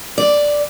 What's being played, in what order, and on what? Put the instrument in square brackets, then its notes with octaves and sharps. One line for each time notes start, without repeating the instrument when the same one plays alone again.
[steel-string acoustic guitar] D5